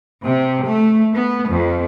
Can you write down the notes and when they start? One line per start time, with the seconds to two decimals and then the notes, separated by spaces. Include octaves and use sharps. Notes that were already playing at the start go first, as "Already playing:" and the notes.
0.24 C3
0.64 A3
1.14 B3
1.49 F2